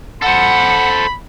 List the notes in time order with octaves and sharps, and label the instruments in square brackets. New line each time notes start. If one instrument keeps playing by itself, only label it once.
[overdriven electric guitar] A4 C5 [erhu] F#5 [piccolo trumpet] B5